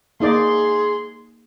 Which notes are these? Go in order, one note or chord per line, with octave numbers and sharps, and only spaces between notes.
G#2 A#3 D#4 G#4 D5 C6